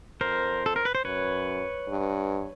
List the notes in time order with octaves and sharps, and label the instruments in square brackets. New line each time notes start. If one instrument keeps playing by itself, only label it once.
[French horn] F2 [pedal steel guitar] A#4 C5
[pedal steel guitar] A4
A#4
B4
C5
[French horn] F#2 [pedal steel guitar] B4 C#5
[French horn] G2